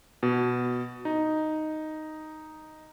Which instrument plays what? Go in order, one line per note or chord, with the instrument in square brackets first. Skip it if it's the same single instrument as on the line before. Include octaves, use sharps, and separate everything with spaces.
[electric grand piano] B2
D#4